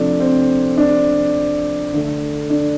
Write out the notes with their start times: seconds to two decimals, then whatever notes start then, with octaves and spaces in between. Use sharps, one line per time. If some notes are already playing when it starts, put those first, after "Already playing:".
Already playing: C3 F3 A3 D4
0.20 C4
0.78 D4
1.94 D3 A3
2.50 D4